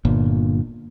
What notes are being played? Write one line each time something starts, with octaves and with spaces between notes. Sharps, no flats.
G1 A#2